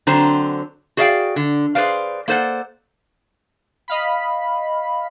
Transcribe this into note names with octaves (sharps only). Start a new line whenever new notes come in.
D3 F#3 C4 C5 A#5
F#4 G#4 D5 E5 F5 G5
D3
G#4 B4 C5 D5 F5
A#3 A4 C5 D5 F#5
D#5 F5 B5